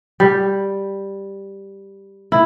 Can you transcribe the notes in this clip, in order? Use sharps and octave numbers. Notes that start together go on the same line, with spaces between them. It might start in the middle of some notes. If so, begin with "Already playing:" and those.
G3
E4